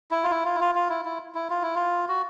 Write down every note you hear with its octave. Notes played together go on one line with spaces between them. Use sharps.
E4
F4
E4
F4
E4
F4
F4
E4
E4
E4
F4
E4
F4
F#4